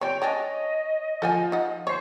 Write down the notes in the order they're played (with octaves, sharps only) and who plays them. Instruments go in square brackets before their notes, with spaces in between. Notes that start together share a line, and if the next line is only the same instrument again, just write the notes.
[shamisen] G3 C4 [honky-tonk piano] C#5 [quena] G5
[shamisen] F#3 C#4 D4 [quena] D#5
[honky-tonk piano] F3 F4 [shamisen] A4 F#5 G#5
[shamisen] D#4 F#5
[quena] C5 [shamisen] C#5 [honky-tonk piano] C#6 C7